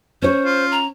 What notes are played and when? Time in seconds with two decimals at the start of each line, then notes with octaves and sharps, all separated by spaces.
0.22 C#4 C5 C#5
0.45 F4
0.71 A#5